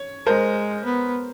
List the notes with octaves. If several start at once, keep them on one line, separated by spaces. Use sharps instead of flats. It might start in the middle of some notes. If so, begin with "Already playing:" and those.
Already playing: C#5
G#3 A#4 C5
B3